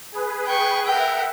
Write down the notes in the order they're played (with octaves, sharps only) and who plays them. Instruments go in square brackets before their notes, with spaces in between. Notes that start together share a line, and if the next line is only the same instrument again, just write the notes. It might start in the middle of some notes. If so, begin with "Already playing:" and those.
[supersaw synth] G#4 B4
[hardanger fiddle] G5 C#6
[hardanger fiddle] A#4 G5 [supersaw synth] E5 F#5